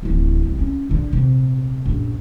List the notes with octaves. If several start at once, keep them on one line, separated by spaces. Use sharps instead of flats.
D1 E3
C2
C#4
A#1 D3
A#1 C3
A#1 F#2